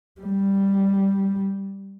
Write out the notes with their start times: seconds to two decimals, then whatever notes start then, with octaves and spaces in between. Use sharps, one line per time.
0.21 G3